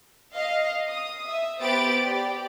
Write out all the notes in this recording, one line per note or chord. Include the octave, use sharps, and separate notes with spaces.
D#5 F5
D#6
E5
B3 G4 C5 B5 A6 D7
G4 D5